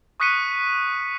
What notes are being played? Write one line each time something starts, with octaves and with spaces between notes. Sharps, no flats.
C#6 D#6 F#6 B6 C#7 D#7